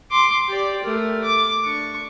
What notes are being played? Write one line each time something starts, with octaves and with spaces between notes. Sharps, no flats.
C6 D6
G4 D5
A3 A#4
D6
D4 C#6